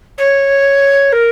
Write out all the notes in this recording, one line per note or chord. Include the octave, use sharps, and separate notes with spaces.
C#5
A#4